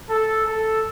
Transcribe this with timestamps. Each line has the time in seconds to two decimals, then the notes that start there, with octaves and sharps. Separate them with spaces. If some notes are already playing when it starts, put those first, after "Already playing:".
0.09 A4
0.46 A4